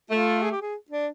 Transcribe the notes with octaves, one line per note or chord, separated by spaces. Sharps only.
A3 F4
G#4
G4
G#4
D4